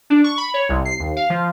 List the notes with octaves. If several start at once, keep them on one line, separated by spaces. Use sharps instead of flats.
D4
C#6
B5
C#5
C2
C7
D#2
F5
F3